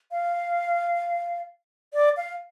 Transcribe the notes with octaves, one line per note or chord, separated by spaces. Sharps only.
F5
D5
F5